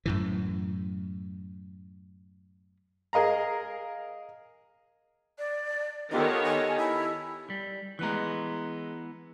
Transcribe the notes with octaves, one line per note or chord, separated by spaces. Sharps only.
F#2 A2 E3
G#4 A#4 D#5 F5 A#5
D5
D#3 B3 D#4 F4 G4 A4 C#5
G#5
E4
G3
E3 G#3 B3 A#5 F#6